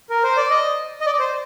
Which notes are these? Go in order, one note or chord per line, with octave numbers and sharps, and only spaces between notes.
A#4
C5
D5
D#5
D#5
D5
C5